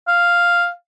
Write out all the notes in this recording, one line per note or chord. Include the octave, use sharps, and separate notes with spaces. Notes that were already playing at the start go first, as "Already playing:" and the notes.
F5